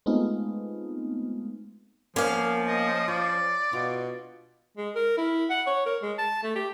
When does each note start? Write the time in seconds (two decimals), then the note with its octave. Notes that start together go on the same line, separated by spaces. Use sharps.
0.06 G#3 A3 B3 C4 D#4 F4
2.16 F3 A#3 B3 C#4 F5
2.67 D#5
3.08 F4 D5
3.73 B2 F4
4.77 G#3
4.95 A#4
5.18 E4
5.50 F#5
5.67 C#5
5.86 A#4
6.02 G#3
6.18 A5
6.43 A3
6.55 G4